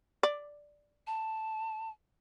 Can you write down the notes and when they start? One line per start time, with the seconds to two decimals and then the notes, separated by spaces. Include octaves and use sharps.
0.23 D5
1.07 A5